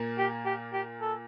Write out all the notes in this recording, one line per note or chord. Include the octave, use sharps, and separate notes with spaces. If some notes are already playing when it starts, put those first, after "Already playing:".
Already playing: A#2 A#3
G4
G4
G4
A4